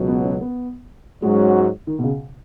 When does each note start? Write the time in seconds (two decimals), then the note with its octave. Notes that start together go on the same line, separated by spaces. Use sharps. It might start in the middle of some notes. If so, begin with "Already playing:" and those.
Already playing: C#2 B2 F#3
0.08 B3
0.25 C#4
0.41 B3
1.22 G#2 F#3 G#3 C#4 F#4
1.87 D#3
1.99 B2
2.04 C#3